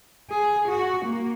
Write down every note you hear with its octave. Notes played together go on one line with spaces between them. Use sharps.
G#4
F#4
A#3